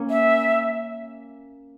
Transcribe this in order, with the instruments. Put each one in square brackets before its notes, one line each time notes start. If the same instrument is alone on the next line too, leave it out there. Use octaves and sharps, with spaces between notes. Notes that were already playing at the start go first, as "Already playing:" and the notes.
Already playing: [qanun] A#3 C#4
[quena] E5